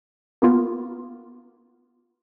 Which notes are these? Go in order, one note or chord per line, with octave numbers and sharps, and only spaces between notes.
A#3 B3 F4